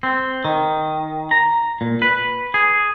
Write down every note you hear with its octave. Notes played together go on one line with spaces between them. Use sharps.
C4
D#3
A#5
A#2
B4
G#4